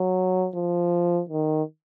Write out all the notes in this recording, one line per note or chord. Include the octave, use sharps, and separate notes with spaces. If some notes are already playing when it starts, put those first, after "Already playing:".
Already playing: F#3
F3
D#3